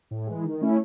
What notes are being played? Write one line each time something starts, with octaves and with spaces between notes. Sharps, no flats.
A2
E3 G#3
D#3
A3 C#4 E4